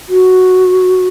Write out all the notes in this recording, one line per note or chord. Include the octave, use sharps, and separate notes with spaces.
F#4